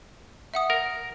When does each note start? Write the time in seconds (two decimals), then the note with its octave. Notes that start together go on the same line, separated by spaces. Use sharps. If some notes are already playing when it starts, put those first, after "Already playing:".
0.54 E5 F#5 D#6
0.70 A#4